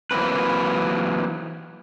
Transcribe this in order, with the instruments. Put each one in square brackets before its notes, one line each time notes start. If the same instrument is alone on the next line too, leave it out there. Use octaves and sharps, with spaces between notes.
[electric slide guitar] E3 F#3 A#3 C4 B4